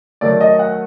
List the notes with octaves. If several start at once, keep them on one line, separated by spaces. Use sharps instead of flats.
D#3 F#3 A3 D5
D#5
F#5